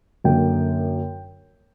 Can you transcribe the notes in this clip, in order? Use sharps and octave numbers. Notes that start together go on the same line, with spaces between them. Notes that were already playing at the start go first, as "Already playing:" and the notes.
F#2 D3 A#3 G5